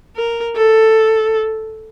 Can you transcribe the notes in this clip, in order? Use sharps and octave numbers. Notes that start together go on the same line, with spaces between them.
A#4
A4